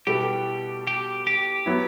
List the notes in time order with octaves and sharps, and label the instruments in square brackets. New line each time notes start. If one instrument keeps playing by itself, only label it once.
[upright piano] B2 G3 B3 E4 A4 [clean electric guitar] G4
[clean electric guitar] G4
G4
[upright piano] F#3 B3 E4